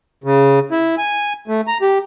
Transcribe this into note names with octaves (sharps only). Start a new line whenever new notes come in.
C#3
E4
G#5
A3
A#5
G4